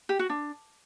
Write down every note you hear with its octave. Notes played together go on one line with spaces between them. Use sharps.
G4
F#4
D4